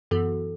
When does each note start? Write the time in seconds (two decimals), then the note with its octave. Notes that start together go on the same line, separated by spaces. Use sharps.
0.11 F#2 E3 B3 F#4 A4